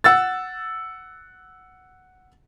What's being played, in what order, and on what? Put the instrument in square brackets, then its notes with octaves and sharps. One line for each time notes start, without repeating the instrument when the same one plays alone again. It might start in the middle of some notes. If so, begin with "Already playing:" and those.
[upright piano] F#5 E6 A6